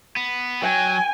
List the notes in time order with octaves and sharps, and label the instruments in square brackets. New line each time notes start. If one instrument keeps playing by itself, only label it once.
[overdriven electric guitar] B3
[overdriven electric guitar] F#3 [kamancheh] G5 G#5